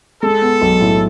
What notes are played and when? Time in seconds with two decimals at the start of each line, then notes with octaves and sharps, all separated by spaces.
0.22 G#3 A4
0.42 B3
0.62 B1
0.81 A2